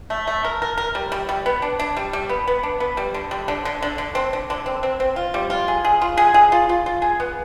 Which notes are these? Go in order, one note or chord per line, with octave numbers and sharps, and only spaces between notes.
A3
A3
A#4
A#4
A#4
G3
G3
G3
B3
D4
D4
G3
G3
B3
B3
D4
B3
G3
D3
G3
D3
D3
D3
D3
C4
D3
D3
C4
C4
C4
F4
G3
F4
G#4
G#4
F4
G#4
G#4
F4
F4
F4
G#4
B3